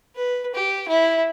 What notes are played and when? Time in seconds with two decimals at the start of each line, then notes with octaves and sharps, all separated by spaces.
0.16 B4
0.55 G4
0.88 E4